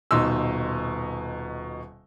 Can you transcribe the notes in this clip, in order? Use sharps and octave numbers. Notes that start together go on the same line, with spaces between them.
D#1 B2 D#4 C6 E6